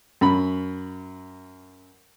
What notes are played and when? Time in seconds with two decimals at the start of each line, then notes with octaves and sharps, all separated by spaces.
0.21 F#2 B5